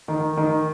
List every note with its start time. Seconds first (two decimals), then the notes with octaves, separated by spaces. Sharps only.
0.08 D#3
0.37 D#3